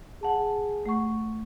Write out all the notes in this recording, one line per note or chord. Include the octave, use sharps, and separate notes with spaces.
G#4 F#5 A5
A3 F#5 C#6